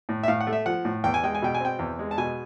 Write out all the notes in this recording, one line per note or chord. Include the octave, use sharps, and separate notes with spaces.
A2
E5
A2 F5
F#5
A3
E5
F3 F#5
A2
E2 G5
G#5
G#3 G5
G#5
B2 G5
G#5
C4 G5
E2
G#3
A5
B2 G#5